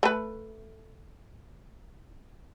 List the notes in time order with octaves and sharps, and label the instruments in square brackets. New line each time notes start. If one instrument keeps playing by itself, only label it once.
[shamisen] A3 B4